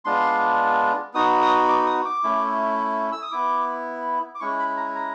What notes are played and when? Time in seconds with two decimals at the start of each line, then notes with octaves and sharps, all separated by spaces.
0.05 G#3 B3 D4 F4 C6
1.14 B3 D#4 F#4 D#6
1.42 D#6
1.68 D6
1.87 D#6
2.05 D6
2.23 A3 C#4 E4
3.12 E6
3.22 D#6
3.31 B3 E4 D6
4.35 D6
4.40 G#3 C#4 E4 C#6
4.59 B5
4.77 A#5
4.95 A#5